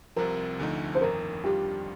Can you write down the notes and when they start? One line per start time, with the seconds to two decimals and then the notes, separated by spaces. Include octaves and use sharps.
0.16 C2 C3 F3 C4 A#4
0.59 D2 D3 F3 A3 D#4
0.95 C5
1.01 G1 F2 D#3 A#4
1.44 F2 D#3 G3 D4 F4 G4